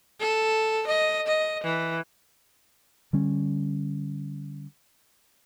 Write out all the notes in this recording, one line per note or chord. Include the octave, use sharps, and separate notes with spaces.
A4
D#5
D#5
E3
D3 G3 C#4